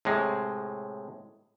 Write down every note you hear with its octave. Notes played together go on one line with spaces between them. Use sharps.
A2 C3 G#3